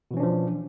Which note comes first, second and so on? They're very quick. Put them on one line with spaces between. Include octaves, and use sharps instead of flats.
B2 E3 C#4 D4 F3